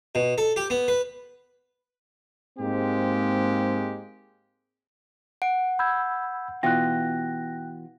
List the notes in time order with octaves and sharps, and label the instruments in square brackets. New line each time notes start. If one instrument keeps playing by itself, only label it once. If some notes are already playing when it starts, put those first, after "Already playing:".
[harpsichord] B2
A4
G4
B3
B4
[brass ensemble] G#2 G#3 A#3 C4 G4
[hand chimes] F#5 [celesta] D7
[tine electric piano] B5 E6 G#6 [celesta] G6
[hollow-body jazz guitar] B2 E3 F4 [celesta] G5 F#6 [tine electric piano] A#6